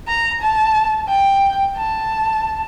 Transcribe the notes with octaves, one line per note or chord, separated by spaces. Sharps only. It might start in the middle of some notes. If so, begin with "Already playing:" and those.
A#5
A5
G5
A5